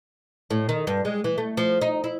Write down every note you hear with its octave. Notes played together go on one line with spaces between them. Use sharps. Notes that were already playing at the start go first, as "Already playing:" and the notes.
A2
D#3
G2
G#3
E3
A3
F3
D#4
E4